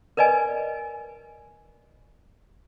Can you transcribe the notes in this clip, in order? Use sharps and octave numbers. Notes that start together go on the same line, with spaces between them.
A#4 B4 D5 D#5 G#5